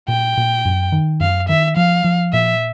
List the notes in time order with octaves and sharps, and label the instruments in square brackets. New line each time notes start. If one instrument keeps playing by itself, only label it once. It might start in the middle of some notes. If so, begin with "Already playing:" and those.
[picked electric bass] A#2 [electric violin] G5
[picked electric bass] A#2
F#2
D#3
[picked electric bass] F#2 [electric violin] F5
[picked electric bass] D#3 [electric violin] E5
[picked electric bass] F3 [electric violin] F5
[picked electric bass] F3
[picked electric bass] A#2 [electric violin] E5